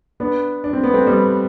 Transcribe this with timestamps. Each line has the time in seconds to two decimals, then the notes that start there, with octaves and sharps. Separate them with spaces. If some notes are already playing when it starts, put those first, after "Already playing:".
0.20 B3 D4
0.64 D4
0.73 C4
0.83 B3
0.94 A3 C4
1.07 G3 B3